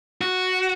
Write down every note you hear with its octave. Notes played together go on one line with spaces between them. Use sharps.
F#4